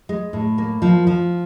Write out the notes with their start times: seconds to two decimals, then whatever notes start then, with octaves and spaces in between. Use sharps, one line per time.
0.09 G#3
0.33 A2
0.58 A#3
0.82 F3
1.07 F3